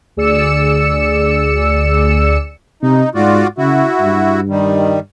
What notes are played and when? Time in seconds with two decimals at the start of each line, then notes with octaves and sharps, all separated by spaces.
0.17 D2 G#4 D5 E6 C#7 E7
2.83 C3 D#4
3.15 G#2 F4 F#4 D5
3.58 C#3 E4 F#4
4.00 G2
4.49 D#3 G3